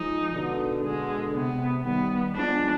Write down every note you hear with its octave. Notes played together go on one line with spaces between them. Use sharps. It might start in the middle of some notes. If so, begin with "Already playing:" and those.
Already playing: F3 G#3 D#4
B2 D3
B2 D3 G#3
C3 B3
D#3 G3 B3
F3 G#3 D4